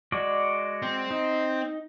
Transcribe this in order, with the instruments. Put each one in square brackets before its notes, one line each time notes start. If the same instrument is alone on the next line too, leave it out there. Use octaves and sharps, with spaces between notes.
[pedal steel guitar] G#3 F#4 D5
[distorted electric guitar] C4
[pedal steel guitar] D#4